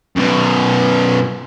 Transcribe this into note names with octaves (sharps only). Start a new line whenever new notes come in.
F#2 B2